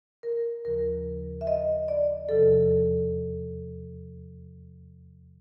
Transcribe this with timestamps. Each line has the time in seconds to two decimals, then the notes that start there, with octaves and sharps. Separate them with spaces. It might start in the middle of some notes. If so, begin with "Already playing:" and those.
0.23 A#4
0.65 D#2 C#3 F3 A#4
1.41 E5
1.47 D#5
1.88 D5
2.29 E2 C3 F3 A4